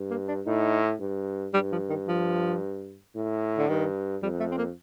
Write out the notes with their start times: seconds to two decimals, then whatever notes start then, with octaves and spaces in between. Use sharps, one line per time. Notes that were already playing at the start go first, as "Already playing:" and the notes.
Already playing: G2
0.11 A#3
0.28 D4
0.46 A2 D#4
1.00 G2
1.54 G2 G3
1.72 F3
1.89 D#3
2.08 F3
3.15 A2
3.58 D3
3.68 G2 D#3
4.22 F2 G3
4.40 A3
4.51 C4
4.58 A#3